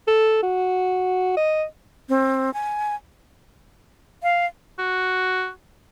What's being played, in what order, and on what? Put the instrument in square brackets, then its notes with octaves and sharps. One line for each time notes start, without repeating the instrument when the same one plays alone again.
[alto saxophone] A4
F#4
D#5
[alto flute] C4
G#5
[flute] F5
[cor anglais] F#4